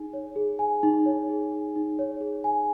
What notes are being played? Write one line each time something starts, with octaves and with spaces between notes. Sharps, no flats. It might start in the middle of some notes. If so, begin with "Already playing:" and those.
Already playing: D#4 G#4 G#5
C#5
G#4
G#5
D#4
C#5
G#4
G#5
D#4
C#5
G#4
G#5